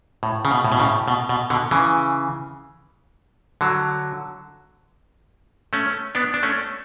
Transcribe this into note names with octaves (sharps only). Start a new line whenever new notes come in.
A2
C#3
B2
A2
B2
A2 C#3
B2
B2
B2 D3
C#3 E3
D3 F#3
A3 C#4
B3 D4
D4
A3 C#4